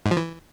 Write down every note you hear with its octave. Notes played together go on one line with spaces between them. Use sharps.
G#2
F3
E3